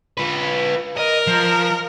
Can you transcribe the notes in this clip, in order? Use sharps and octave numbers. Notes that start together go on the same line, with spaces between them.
F4 B4
A#4 D#5
F3